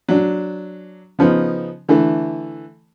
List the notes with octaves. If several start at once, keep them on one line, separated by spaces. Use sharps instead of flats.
F#3 D4
C#3 F3 B3 D#4
D3 E3 A3